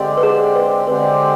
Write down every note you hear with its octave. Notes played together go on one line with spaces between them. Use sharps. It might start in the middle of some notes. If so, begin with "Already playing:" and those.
Already playing: D3 G#3 C4 G4 D5
B4
G#4
B4
D3 G#3 C4 G4 B4 D5